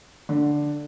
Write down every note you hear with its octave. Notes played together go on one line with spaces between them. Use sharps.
D3